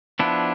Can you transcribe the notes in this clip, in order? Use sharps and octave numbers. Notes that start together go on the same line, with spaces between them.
F3 B3 D4 E4